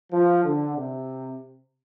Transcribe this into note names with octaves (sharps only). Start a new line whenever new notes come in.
F3
D3
C3